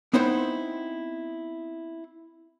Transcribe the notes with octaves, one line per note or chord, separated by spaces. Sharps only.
B3 C4 D#4 E4 C5 F#5